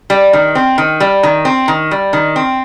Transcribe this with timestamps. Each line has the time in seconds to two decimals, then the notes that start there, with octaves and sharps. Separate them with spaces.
0.10 G3
0.33 D#3
0.55 C4
0.78 D#3
1.00 G3
1.23 D#3
1.45 C4
1.68 D#3
1.91 G3
2.13 D#3
2.36 C4